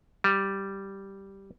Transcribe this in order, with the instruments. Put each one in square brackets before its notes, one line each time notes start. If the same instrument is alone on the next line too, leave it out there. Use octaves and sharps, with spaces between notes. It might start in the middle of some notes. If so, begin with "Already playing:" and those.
[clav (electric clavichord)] G3